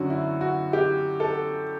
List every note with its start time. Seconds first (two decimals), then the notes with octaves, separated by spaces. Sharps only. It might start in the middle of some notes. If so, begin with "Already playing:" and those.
Already playing: F#2 D3 F#3 F#4
0.10 E4
0.41 F#4
0.73 G4
1.20 A4